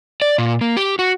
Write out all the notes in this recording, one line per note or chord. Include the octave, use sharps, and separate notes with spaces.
D5
A#2
A#3
G4
F#4